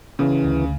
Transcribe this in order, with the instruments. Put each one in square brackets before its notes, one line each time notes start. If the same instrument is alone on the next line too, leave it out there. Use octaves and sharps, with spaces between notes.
[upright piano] C#3 [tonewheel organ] E3
[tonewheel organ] D2